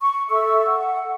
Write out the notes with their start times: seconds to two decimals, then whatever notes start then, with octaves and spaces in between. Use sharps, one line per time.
0.01 C#6
0.29 A4 E5 C#6 E6
0.66 F#5